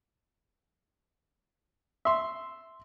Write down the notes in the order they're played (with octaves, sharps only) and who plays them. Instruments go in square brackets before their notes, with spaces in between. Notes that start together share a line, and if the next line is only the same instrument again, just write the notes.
[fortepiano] E5 C6